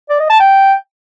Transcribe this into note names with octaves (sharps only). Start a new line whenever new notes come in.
D5
D#5
A5
G5